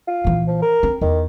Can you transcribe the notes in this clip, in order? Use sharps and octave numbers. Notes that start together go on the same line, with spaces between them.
F4
A#2 E3
F3
A#4
C4
E2 D#3